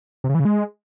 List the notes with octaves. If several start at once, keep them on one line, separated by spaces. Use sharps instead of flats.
C3
C#3
E3
C#3
G#3